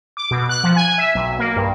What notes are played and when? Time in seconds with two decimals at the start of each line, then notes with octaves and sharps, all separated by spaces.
0.17 D6
0.31 B2
0.49 F#6
0.64 F3
0.76 G#5
0.98 E5
1.15 B1
1.39 A#3
1.56 G2